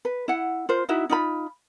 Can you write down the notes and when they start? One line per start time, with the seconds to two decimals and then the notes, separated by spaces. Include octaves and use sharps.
0.05 B4
0.28 E4 F#5
0.69 F4 A#4 C5
0.89 D#4 E4 F#4 E5
1.10 D#4 F4 B5